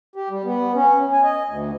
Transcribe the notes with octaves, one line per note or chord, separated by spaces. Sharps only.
G4
G3
B3
C#4
G#5
D#5
D2